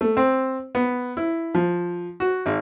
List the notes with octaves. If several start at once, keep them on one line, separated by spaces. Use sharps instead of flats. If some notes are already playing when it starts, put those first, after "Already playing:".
A3
C4
B3
E4
F3
F#4
G#1